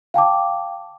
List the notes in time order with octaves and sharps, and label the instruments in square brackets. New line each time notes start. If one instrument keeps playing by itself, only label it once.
[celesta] F5 G5 A5 D6